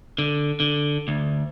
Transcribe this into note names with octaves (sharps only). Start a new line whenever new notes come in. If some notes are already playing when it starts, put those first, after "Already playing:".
D3
D3
D2